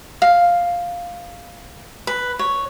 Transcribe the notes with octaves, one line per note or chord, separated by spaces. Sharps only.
F5
B4
C#5